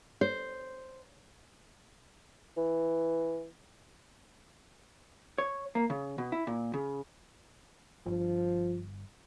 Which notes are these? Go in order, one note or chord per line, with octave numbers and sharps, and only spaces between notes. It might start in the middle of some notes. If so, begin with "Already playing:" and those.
C5
E3
C#5
A#3
C#3
B2
E4
A#2
C#3
G1 G2 F3